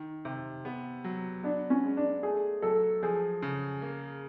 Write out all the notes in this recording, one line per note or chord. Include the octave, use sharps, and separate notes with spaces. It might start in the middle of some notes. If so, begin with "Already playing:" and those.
Already playing: D#3
C3
B3
F#3
B3 D4
C#4
G#3
D4
A3 G#4
F#3 A4
F3 G#4
C#3
A#3